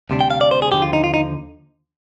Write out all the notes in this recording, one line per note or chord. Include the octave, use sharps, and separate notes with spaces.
D2 C3 G3 D4
G5
F5
D5
C5
G#4
D#2 D3 F3 G4
F4
D#4
F4
D#4